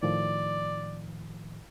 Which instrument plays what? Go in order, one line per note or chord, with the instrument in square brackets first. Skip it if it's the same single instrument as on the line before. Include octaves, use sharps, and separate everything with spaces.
[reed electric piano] A2 D#3 F3 [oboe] D5